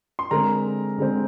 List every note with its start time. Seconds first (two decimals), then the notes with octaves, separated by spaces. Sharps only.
0.19 C6
0.31 D3 G#3 C4 A#4 A#5
0.98 D3 G#3 C4